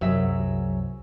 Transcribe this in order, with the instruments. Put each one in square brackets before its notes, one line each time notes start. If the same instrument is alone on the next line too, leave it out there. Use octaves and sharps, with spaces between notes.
[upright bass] C2 F#2 [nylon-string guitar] F#3 G#4 E5